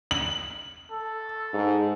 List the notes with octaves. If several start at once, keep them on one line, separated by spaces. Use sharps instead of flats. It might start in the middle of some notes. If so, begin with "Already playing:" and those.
F#7
A4
G#2